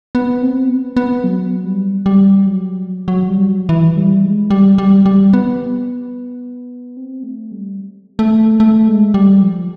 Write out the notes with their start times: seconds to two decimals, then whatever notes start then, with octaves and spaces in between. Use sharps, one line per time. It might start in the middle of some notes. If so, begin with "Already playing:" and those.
0.15 B3
0.42 C4
0.69 B3
0.97 B3
1.24 F#3
1.65 G3
2.06 G3
2.46 F#3
3.08 F#3
3.29 G3
3.49 F#3
3.69 E3
3.97 G3
4.24 G#3
4.51 G3
4.78 G3
5.06 G3
5.33 B3
6.97 C4
7.23 A3
7.51 G3
8.19 A3
8.60 A3
8.88 G#3
9.14 G3
9.42 F3